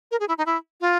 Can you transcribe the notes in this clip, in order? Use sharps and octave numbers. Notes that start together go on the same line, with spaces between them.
A#4
G#4
E4
D#4
E4
F4